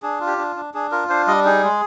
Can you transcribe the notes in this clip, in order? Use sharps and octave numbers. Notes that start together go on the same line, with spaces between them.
D4 G#4
F4
G4
D4
D4
D4 G#4
F4 A#4
D4 C5
G3 D#5
D#4 G#4
G#3